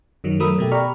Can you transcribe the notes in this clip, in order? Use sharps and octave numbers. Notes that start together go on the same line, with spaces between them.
F#2 D#3 F#3
F#3 A3 A#4 B5 D#6 E6
B2 A3 G4
G4 D5 A#5 B5 C#6 F6